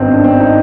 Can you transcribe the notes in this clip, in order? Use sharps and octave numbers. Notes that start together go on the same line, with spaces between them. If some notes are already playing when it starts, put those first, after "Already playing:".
Already playing: G#1 G2 B3 C4 D#4
D4
C4
D#4